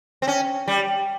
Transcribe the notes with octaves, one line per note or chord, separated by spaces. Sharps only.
C4
C#4
G3